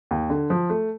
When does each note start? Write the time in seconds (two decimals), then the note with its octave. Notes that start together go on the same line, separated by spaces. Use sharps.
0.11 D#2
0.30 D3
0.50 F3
0.70 A3